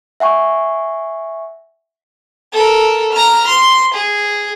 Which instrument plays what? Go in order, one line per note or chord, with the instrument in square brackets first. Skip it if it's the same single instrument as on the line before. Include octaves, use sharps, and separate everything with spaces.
[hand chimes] E5 F#5 G#5 C#6
[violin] A4 A#4
A#5 F6
C6
G#4